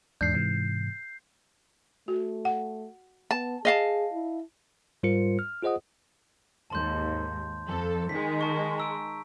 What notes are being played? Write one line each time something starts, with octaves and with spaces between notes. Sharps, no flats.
E2 G#2 D4 G6 C7
G#2 C3 E3
A3 F#4
F#5
B3 A5
G#4 D#5 F5 A5
E4
G#2 G3 F4 A#4 C5 C#7
F6
F4 G#4 C5 D#5 F#5 D#6
D#2 G#2 A5 C6 G6
F2 A4
D#3 G#3 B6
A5 C#6
A#5 E6 D7